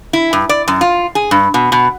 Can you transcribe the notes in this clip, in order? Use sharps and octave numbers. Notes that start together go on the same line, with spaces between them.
E4
G2
D5
F#2
F4
G#4
G2
B2
B2